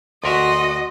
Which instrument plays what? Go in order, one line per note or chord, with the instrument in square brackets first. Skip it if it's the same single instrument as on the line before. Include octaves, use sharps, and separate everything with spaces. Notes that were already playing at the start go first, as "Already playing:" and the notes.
[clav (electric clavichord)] D2 A#4 E5 [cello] F#4 [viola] D#5 [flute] C6